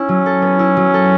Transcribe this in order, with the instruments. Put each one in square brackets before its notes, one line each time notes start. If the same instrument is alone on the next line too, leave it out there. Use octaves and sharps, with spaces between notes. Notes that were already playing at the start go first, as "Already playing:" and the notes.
Already playing: [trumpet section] C#4 [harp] E4
[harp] F#3
A4
B3
E4
F#3
A4